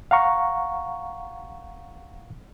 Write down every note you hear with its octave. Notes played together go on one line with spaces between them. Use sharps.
F5 F#5 A#5 C#6